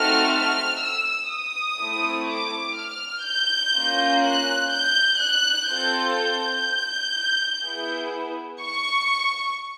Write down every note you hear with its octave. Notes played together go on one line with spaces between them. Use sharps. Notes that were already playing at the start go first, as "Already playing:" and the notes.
Already playing: A3 C4 D#4 F#4 A4 F6
F6
E6
D#6
A3 C4 E4
D6
F6
G6
A#3 C#4 F4
F#6
G6
F#6
C4 F4 A4 G6
G6
B3 E4 G#4
C#6